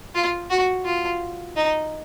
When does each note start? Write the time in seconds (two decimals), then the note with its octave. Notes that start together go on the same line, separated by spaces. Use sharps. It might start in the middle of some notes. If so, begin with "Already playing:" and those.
0.15 F4
0.50 F#4
0.85 F4
1.56 D#4